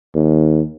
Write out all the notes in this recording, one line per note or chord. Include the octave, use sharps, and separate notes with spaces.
D#2